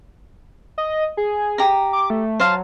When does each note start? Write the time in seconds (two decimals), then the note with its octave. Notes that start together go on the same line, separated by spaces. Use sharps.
0.78 D#5
1.17 G#4
1.58 G4 A#5
1.93 D6
2.10 A3
2.40 F#3 C5 F5 A5